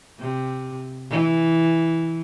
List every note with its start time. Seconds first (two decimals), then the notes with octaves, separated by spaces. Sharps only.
0.19 C3
1.10 E3